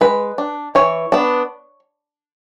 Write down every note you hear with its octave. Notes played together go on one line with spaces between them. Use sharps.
G#3 B4
D4
E3 C#5
B3 D4